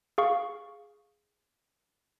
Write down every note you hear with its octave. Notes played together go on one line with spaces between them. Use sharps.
G#4 F5 C#6